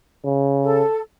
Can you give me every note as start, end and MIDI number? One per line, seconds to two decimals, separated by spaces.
0.25 0.82 49
0.63 1.00 69